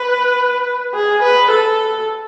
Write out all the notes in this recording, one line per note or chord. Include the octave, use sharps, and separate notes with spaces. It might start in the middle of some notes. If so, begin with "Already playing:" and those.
Already playing: B4
G#4
B4
A4